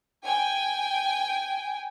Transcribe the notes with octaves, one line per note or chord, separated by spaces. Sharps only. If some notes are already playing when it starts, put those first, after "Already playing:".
G5 G#5